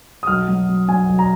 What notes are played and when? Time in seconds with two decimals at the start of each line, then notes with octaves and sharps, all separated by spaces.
0.23 D#6
0.27 B1 F6
0.48 F#3
0.69 F#3
0.88 F#3 G#5
1.09 B1
1.19 A#5